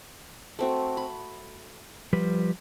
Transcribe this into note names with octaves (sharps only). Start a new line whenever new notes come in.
A3 C4 F#4
B5
F3 G3 B4